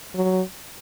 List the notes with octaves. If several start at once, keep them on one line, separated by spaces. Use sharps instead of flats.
F#3